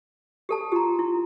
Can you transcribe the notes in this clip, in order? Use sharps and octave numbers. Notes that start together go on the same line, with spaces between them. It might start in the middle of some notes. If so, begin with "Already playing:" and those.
G4 A4 A5
F4 G4 A#5
E4